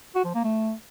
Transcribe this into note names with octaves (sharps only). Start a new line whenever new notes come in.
F#4
F3
A#3
A3